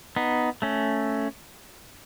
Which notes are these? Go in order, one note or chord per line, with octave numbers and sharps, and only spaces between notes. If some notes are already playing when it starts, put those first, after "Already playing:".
B3 D#4
A3 C#4